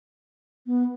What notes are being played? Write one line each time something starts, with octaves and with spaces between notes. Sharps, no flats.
B3